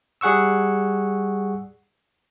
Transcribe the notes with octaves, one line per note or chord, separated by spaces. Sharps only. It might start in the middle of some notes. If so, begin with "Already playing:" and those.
G3 G#4 F#5 C#6 E6